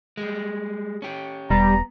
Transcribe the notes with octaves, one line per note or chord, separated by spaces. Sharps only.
G3 G#3
C#4 G4
E1 G3 B3 A#5